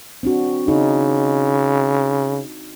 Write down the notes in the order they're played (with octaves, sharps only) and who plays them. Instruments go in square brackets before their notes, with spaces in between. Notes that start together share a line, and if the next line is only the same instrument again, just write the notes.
[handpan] C4 D4 F#4
[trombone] C#3 [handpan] D#4